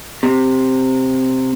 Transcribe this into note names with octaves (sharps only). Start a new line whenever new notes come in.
C3